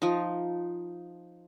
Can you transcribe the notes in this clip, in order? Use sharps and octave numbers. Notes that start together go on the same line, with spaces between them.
F3 D#4